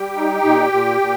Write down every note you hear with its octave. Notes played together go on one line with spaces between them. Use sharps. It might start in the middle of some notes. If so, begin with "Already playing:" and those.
Already playing: G3 G4 G5
D#4
A#2
A#2
A#2